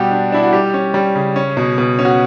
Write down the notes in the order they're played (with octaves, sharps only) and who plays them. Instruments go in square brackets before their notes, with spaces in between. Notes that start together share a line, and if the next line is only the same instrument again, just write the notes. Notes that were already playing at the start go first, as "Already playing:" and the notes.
Already playing: [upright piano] B2 G3 F#4 G4
D4
D4 E4
F#4
G3 G4
C#4
G3
C#3
C#4
B2
B2
C#4
F#4